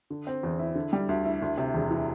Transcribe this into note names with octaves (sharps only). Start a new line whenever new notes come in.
D3
C4
E2
E4
D3
G3
D2
E4
D2
C3
E1
E3